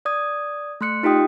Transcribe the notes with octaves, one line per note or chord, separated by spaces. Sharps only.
D5 D#6 G#6
A3 C6 F#6 C#7
D#4 F4 G4 G5 D#6